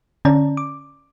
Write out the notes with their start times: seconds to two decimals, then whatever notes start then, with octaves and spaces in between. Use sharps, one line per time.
0.25 D3 C#4 D5 A5 A#5
0.57 D6